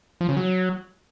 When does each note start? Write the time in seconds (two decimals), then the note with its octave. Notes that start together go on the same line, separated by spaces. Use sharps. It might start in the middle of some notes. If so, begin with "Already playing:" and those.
0.21 F3
0.29 C#3
0.37 F#3